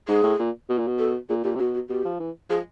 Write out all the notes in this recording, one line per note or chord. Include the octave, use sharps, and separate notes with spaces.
G#2 G#4
A2
A#2
B2
A#2
B2
A4
A#2 G#4
A#2 G4
C3
B2 F#4
F#4
B2 G4
F3
E3
F3 G#4